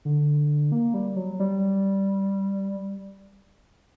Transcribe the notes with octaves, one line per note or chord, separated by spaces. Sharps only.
D3
A#3
G3
F#3
G3